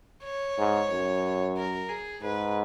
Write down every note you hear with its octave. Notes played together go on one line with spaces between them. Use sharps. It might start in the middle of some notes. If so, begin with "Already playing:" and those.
C#5
G#2
F#2
A#4
G#4
G#2 B4